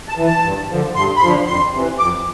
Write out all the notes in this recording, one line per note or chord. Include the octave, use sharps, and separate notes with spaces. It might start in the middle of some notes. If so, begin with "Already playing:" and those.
A5
E3
A5
G2
D3 F3
G2 C6
B5
D3 F3 C6
F2 C6
C3 E3
F2 D6